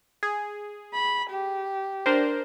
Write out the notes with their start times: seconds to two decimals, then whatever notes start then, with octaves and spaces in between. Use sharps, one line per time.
0.23 G#4
0.94 B5
1.30 G4
2.06 D4 A#4 C5